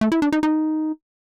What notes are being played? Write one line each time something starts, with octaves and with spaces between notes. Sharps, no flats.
A3
E4
D4
D#4
D#4